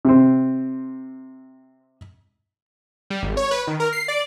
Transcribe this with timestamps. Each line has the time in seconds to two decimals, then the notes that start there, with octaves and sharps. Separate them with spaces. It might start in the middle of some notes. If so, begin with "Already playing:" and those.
0.05 C3 C4
3.10 G3
3.23 G#1
3.37 C#5
3.51 B4
3.67 D#3
3.80 A#4
3.92 C7
4.08 D5